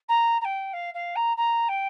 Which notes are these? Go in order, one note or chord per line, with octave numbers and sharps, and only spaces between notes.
A#5
A#5
G5
F5
F5
A#5
A#5
G5